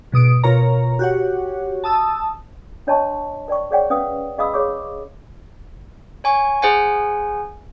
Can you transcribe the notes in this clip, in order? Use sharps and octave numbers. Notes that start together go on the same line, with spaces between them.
G#2 B2 D#6 D7
B2 F4 A#4 C#5 A#5
F#4 G4 C#5 F#5
A5 D#6 E6
D4 C#5 D#5 A5 C6 C#6
A#4 D5 G5 C#6
G#4 A#4 C#5 D5 F#5 G5
C#4 B4 F5 G5 D#6
G#4 D#5 F5 B5 D#6 E6
G#4 C#5 B5 C#6 D6 E6
C#5 G#5 C#6
G#4 C5 F#5 G#5